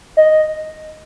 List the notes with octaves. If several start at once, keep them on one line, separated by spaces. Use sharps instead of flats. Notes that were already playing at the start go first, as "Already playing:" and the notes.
D#5